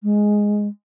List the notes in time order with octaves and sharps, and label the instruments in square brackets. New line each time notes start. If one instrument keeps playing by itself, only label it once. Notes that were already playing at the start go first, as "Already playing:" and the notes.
[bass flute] G#3